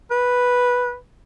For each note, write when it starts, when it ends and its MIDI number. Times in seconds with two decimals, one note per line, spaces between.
0.11 0.96 71